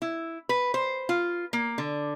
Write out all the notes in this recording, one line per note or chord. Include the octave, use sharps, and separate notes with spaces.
E4
B4
C5
F4
A#3
D3